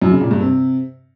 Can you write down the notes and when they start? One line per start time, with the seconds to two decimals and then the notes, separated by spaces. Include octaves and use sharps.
0.02 F#2
0.11 C#3
0.21 A#2
0.31 G2
0.41 C3